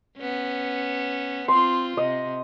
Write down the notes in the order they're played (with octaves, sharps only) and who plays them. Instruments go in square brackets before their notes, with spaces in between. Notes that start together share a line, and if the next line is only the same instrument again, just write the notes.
[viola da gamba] B3 C#4
[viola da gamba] C4 F4 [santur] C6
[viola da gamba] C3 [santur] D#5